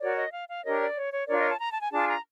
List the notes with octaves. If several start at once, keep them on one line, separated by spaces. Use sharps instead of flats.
F#4 A#4 C#5 D5
D#5
F5
F5
D4 G4 A#4 C#5 D#5
D5
C#5
C#5
D4 F4 A#4 C#5 D5
D#5
A5
A#5
A5
G#5
D4 F4 G#4 A5
A#5